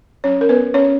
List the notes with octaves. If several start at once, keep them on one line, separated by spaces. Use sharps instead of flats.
F#3 C#4 C#5
A#4
B3 B4
C#4 C#5